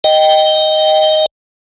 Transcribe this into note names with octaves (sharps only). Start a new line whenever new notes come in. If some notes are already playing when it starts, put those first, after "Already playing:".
D#5 G5